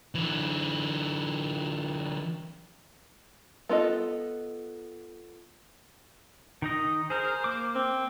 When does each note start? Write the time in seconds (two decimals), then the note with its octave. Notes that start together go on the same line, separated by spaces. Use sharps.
0.15 D3 E3
3.69 B3 F4 A4 D#5
6.62 D#3 D#4 D#5
7.10 G#4 A#4 C5
7.44 A#3 D6
7.75 C4